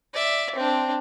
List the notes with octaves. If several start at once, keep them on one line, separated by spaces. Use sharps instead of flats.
D5 E5
C4 D4